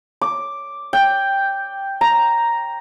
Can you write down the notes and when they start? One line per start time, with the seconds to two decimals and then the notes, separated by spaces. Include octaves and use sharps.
0.21 D6
0.93 G5
2.01 A#5